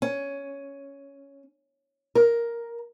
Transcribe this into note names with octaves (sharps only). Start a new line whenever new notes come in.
C#4
A#4